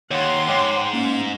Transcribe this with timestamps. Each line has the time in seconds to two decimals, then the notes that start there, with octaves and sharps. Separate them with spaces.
0.11 D#2 C#5 F#5 C6
0.48 G#2 C#5 G5 D6
0.93 A#3 C#4